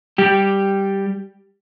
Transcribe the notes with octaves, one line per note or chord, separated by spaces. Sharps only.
G3 G4